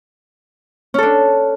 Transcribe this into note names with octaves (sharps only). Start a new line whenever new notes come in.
C#4 D4 A4